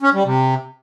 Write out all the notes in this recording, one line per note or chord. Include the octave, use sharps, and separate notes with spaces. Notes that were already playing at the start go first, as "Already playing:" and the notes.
C#4
G3
C3